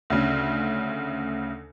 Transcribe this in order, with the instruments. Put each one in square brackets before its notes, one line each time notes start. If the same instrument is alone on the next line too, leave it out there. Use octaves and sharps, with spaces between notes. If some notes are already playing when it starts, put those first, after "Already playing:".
[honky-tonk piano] D2 C#3